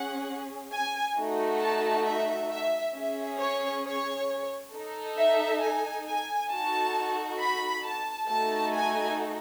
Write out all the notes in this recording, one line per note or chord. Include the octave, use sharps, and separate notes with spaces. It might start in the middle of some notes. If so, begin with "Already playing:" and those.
Already playing: C#4 G#4 F#5
G#5
A3 D#4 F#4
A5
E5
E5
C#4 G#4 E5
C#5
C#5
D#4 A4
E5
G#5
G#5
D#4 F#4 A4 A5
B5
A5
A3 D#4 F#4 A4 A5
G#5